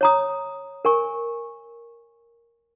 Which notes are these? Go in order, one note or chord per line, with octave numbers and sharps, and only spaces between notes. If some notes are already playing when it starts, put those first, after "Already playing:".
C#5 A#5 D#6
A#4 G#5 C#6